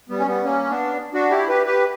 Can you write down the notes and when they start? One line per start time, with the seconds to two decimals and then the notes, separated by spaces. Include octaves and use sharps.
0.09 G3 B3
0.19 C#4
0.26 G3 B3
0.44 A#3 C#4
0.70 B3 D4
1.14 D4 F#4
1.30 E4 G4
1.49 G4 B4
1.66 G4 B4